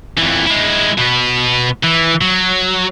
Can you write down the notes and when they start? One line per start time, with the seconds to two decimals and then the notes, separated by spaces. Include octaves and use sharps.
0.18 F2 E3
0.46 G#3 E4
0.98 B2 B3
1.83 E3
2.21 F#3